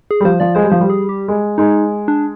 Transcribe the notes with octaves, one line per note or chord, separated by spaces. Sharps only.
G#4
G3
F3 C5
F3 D5
G#3 C5
G3
F3 C5
G3
G#4
G4
G#3
G#3 D#4
D4